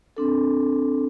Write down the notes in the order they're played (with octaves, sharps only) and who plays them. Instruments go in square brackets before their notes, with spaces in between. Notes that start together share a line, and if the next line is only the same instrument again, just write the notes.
[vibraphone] C4 D4 A4